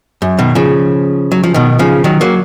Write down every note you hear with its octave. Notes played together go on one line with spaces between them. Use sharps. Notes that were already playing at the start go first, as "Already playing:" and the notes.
F#2
B2 D#3
C#3 F3
F#3
F3
B2 D#3
C#3 F3
D#3 F#3
F#3 A#3